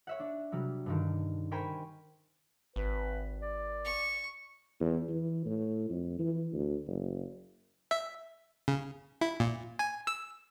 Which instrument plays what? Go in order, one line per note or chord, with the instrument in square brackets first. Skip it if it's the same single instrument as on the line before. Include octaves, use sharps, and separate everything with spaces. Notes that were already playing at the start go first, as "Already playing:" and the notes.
[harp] C#5 E5 F#5
D4
C3 F#3 G3
G2 D3 D#3
A#4 C5 G5 G#5 B5 C#6
[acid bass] G#1 [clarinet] B4
[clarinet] D5
[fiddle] C#6
[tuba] E2
E3
A2
F2
E3
D2
F#1
[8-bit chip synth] E5
C#3
E4
A#2
G#5
E6